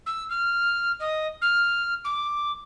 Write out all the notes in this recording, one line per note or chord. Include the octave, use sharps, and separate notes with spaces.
E6
F6
D#5
F6
D6